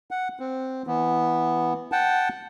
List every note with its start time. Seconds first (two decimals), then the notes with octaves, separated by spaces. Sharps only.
0.11 F#5
0.40 C4
0.87 E3 B3
1.92 F#5 G5 A5